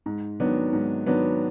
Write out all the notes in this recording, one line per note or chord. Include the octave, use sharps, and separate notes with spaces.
G#2
D#3 F#3 B3 D4
G#2
D#3 F#3 B3 D4